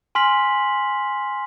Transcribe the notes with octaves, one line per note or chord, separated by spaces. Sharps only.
G#5 C6 F6 B6 F#7